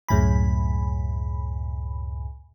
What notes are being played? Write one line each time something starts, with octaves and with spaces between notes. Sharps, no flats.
C#2 F#2 A2 G#5 B5